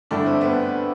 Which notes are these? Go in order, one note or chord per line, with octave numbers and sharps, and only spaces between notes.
G2 D3 A3 D4 E4
C4
B3